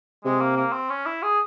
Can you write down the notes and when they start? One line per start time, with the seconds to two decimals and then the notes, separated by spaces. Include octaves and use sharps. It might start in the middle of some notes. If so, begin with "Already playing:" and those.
0.25 C3 G#3
0.40 A#3
0.56 A#3
0.73 C4
0.89 C#4
1.06 E4
1.22 G#4